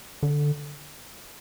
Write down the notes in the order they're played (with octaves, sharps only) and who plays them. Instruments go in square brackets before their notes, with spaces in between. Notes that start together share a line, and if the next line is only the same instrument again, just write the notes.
[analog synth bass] D3